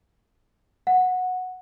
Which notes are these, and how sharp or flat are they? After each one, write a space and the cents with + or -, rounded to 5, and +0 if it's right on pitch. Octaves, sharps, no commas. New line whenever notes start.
F#5 -10